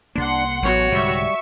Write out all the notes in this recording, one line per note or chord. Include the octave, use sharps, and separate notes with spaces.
C2 F#2 A#3 D4 F#5 C6
A1 F#3 G3 B3 F#4 C#5
C2 G#2 D3 G3 E5 C#6